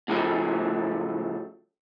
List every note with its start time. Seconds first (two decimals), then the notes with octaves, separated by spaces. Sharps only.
0.08 A2 C#3 F3 F#3 A3